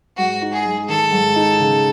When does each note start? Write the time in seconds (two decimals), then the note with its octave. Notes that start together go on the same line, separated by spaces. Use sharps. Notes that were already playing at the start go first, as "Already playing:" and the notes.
0.17 G#2 F#4
0.42 D#4
0.53 G#4
0.66 G#3
0.88 D#3 A4
1.12 G#2
1.36 D#4
1.60 C#3